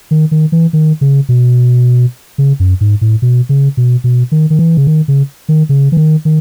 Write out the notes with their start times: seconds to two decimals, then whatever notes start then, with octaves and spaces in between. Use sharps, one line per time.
0.11 D#3
0.31 D#3
0.52 E3
0.73 D#3
1.01 C#3
1.29 B2
2.38 C#3
2.60 F#2
2.81 G#2
3.01 A2
3.22 B2
3.49 C#3
3.77 B2
4.04 B2
4.32 D#3
4.50 D#3
4.59 E3
4.77 C#3
4.87 D#3
5.08 C#3
5.49 D#3
5.69 C#3
5.92 E3
5.97 D#3
6.25 D#3